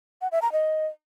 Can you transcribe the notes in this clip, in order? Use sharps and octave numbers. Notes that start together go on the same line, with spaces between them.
F#5
E5
A#5
D#5